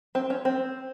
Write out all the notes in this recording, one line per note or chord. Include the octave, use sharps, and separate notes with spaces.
C4
C#4
C4